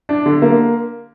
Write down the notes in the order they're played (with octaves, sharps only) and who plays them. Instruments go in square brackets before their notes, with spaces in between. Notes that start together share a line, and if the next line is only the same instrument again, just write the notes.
[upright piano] D4
D3
A#3